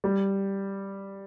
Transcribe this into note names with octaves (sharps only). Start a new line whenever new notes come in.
G3